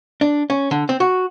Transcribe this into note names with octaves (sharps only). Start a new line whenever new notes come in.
D4
C#4
D3
C4
F#4